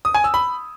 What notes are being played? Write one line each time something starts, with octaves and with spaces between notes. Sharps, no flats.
D#6
G#5
E6
B5